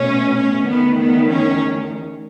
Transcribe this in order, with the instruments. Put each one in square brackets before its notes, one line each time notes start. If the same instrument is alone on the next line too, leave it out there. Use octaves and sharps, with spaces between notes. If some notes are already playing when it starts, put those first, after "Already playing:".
Already playing: [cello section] B2 A3 C#4
C#4
E2 D#3 A3 B3
B3
C#4